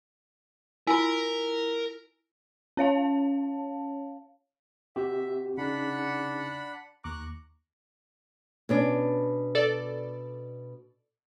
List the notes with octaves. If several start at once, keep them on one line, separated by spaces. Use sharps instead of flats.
E4 F4 A#4 G#5 A#5
C#4 C#5 F5 A5
C4 F#4 G4 E5
C#3 D4 D#4 F#5 B5
D#2 A#5 C#6 D6 F#6
B2 C#4 D4
A4 D5